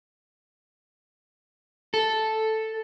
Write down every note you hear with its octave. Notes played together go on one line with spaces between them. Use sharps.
A4